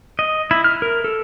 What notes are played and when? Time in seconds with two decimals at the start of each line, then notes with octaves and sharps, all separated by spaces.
0.19 D#5
0.51 E4
0.64 F6
0.82 A#4
1.04 A4